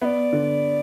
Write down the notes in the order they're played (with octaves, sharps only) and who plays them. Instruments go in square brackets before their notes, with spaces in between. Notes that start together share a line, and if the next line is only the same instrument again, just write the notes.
[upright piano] B3 [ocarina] D5 E5
[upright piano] D3